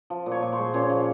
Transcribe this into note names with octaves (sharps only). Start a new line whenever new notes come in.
F3
A#2
C#5 C#6
A#2
C5 C6
G#3
A#2 C#4 C#5
F3